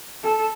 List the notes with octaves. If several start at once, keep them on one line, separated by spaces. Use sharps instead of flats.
A4